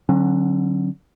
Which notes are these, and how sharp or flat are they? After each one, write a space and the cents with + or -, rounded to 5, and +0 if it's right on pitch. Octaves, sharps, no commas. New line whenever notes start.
D3 +0 F#3 +0 C#4 -45